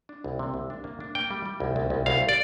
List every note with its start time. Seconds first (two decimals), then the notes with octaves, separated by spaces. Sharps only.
0.09 D4
0.24 C2
0.39 C3
0.54 C2
0.70 D4
0.84 A#3
1.00 D4
1.15 A#3 G5
1.31 G3
1.46 G3
1.60 C2
1.76 C2
1.90 C2
2.06 C2 F5
2.29 D5